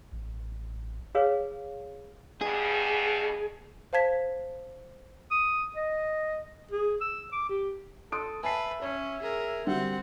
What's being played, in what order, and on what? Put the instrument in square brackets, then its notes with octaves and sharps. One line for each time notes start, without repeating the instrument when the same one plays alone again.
[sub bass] A1
[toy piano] G#4 B4 C#5 F5
[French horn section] G2 B2 [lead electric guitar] G#4
[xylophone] C5 F5 A5 G#6 B6
[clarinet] D#6
D#5
G#4
E6
D6
G4
[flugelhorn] A4 [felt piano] C6 D#6 D7
[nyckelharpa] B4 [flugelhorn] E5 [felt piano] G#5 A5 C7
[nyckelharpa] C#4 [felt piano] C#5
[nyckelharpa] G#4 A#4
[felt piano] D3 G3 F#4 [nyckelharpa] C4 F#5